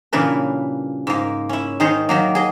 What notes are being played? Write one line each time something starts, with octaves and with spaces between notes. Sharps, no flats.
G2 A#2 C#3 E3 A#4 B4
G#2 A#3
C#4 E4
D#3 D#4 G#4 C5 C#5
D#3 F#3 A#3
G#4 D#5